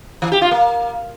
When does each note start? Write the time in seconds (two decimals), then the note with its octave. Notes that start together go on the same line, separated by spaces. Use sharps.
0.22 E3
0.32 G4
0.42 F4
0.51 A#3